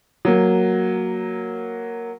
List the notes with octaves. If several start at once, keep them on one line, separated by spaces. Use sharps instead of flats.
F#3 A#3